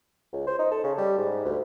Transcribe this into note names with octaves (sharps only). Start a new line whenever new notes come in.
C#2
C5
D#4
A4
C#3
G3
G#2
D2